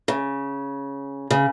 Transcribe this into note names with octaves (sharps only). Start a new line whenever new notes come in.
C#3
C#3